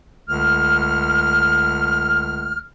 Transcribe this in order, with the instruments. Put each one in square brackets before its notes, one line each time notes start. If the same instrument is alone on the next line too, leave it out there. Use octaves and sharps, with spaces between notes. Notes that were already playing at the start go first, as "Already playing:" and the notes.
[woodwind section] C#2 D3 A3 F6